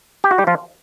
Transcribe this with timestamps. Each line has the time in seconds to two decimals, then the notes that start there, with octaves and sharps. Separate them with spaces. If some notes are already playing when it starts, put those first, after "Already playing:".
0.24 G4
0.31 F#4
0.38 G3 G4
0.47 F3 F4